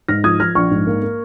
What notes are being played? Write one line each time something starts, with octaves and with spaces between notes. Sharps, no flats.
G#2 F6 A#6
F3 D#6 G#6
F3 F6 A#6
A#1 C#6 F6
G#2
A#3
A#3